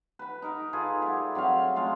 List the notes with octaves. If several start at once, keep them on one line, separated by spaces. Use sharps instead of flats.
B4 B5
D#4 A#4 B4
F4 G#4 A4 B4
G3 D5 E5 F#5
F#3 C4 E5 F5
G#3 A3 C#4 F4